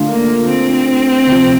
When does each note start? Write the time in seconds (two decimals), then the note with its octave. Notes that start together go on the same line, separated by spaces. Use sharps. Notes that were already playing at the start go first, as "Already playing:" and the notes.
Already playing: D3 A3 D4 F4
0.09 A#3
0.49 C4
1.27 D2 C3 F3